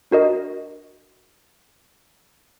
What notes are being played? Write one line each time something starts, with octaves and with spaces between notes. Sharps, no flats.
D4 F#4 A#4 D#5